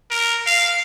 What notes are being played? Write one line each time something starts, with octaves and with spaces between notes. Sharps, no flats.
A#4
F5